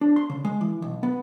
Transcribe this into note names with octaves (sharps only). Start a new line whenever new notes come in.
D4
C6
C#3
G#3
E3
B1
B3